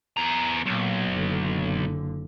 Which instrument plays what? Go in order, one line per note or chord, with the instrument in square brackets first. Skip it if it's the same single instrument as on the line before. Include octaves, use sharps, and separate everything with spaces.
[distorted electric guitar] E2 A#5
[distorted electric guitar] B1 [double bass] A#2
[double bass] F#1 D3